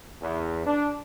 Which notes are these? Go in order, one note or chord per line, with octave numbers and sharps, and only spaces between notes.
E2
D4